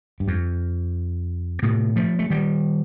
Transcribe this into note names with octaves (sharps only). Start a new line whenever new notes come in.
G2
F2
A2 C3
F3 A3
A3
D#3 G3